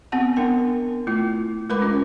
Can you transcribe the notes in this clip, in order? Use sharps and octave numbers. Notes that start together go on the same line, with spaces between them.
B3 C4 F#5 A5
B3 D4 A#4 G5
A3 E4 F4
G#3 A#4 B4 B5 D6
C#4 F4